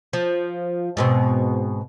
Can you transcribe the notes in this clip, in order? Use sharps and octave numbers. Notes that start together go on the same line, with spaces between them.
F3
G#2 B2 C4